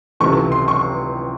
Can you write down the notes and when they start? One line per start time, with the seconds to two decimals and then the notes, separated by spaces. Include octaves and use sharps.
0.20 C#2 C3 E3 A3 C#6
0.52 C6
0.68 C#6